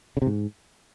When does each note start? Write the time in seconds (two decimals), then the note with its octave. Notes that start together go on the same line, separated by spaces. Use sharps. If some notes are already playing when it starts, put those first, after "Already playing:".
0.17 C#3
0.22 C3
0.27 G#2